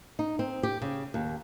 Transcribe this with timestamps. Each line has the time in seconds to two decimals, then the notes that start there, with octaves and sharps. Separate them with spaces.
0.19 D#4
0.39 C4
0.63 G4
0.82 C#3
1.14 D#2